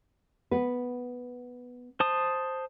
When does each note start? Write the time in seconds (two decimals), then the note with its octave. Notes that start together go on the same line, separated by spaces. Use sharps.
0.51 B3 B4
2.00 C5 A5 D#6